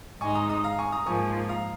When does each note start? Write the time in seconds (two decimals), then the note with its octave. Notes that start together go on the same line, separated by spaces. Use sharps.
0.21 G#2 G#3 D#4 G#5 C#6
0.35 A#5 D#6
0.50 A#5 D#6
0.64 F5 A#5
0.78 G#5 C#6
0.92 A#5 D#6
1.07 G#2 F3 A#3 G#5 C#6
1.49 F5 A#5